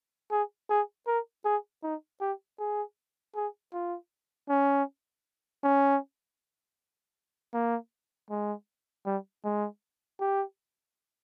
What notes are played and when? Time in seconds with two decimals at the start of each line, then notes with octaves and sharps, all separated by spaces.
0.31 G#4
0.70 G#4
1.07 A#4
1.45 G#4
1.83 D#4
2.21 G4
2.59 G#4
3.36 G#4
3.74 F4
4.49 C#4
5.64 C#4
7.54 A#3
8.30 G#3
9.06 G3
9.44 G#3
10.20 G4